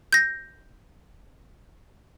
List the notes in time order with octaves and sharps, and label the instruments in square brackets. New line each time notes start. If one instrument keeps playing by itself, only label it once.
[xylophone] G6 A#6